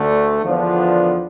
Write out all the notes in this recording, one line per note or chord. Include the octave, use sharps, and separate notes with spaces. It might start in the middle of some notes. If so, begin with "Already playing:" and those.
Already playing: D2 D3 A3
E2 D3 F3 B3 D4